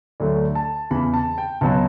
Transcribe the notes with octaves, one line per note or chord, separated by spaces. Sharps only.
D2 D3 F#3 A3 D5
A5
E2 C#3 E3 B5
A5
G5
C#2 B2 F#3 A5